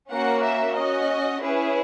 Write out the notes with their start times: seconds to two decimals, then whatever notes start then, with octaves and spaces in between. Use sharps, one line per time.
0.11 A#3 C#4 F#4 F#5
0.43 E5
0.75 C#4 F#4 D#5
1.39 C#4 E4 G#4 B4